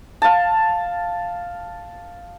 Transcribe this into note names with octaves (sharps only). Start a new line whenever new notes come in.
F5 A5